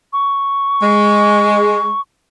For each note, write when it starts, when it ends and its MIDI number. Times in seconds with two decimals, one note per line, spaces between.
0.13 2.01 85
0.82 1.92 56